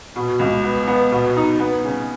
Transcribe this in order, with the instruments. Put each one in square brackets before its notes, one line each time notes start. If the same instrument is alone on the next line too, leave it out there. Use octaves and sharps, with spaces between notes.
[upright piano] B2
C#2
B3
B3
B2
D#4
B3
C#3